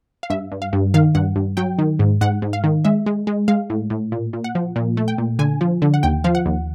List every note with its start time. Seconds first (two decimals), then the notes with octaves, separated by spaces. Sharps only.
0.23 F5
0.30 G2 E5
0.52 G2
0.62 F5
0.73 G2
0.94 D#3 F5
1.15 G2 F#5
1.36 G2
1.57 F#3 G5
1.79 D#3
1.99 G#2
2.21 G#2 F#5
2.42 G#2
2.53 F5
2.64 D#3
2.85 G#3 E5
3.06 G#3
3.27 G#3
3.48 G#3 F5
3.70 A2
3.90 A2
4.12 A#2
4.33 A#2
4.44 F#5
4.55 F3
4.76 A#2
4.97 A3
5.08 G5
5.18 A#2
5.39 D3 G#5
5.61 F3
5.82 D3
5.94 F#5
6.03 D#2 G5
6.24 F3 F5
6.35 F#5
6.46 D#2